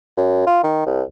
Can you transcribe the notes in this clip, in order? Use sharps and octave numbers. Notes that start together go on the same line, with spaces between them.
F#2
F4
D#3
C2